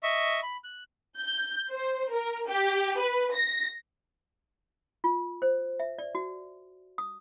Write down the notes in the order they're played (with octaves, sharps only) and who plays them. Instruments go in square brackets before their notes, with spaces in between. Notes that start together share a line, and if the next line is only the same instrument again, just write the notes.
[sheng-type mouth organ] D#5 E5 C#6
B5
F#6
[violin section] G6
C5
A#4
G4
B4
A#6
[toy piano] F4
C5
E5
D5
F#4
D#6